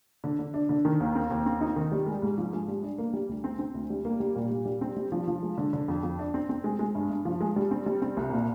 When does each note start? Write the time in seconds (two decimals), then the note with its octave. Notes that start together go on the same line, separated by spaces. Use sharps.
0.24 D3
0.39 D3
0.54 D4
0.69 D3
0.85 D#3
1.00 D#2
1.15 C4
1.30 D#2
1.46 C4
1.61 D#4
1.76 D#3
1.92 G3
2.07 G#3
2.22 G#2
2.38 F3
2.53 G#3
2.68 G3
2.83 D4
2.98 A#3
3.13 G3
3.29 D2
3.44 C4
3.59 C4
3.74 D2
3.90 G3
4.05 A#3
4.20 G3
4.36 A#2
4.51 G3
4.65 G3
4.81 C4
4.97 G3
5.12 F3
5.28 F3
5.42 G#3
5.58 D3
5.73 D3
5.88 F2
6.03 F2
6.19 D4
6.34 C4
6.49 C4
6.64 G#3
6.79 G#3
6.95 G2
7.10 G2
7.25 F3
7.41 G#3
7.56 G3
7.71 C4
7.86 G3
8.02 C4
8.17 C2
8.32 A#2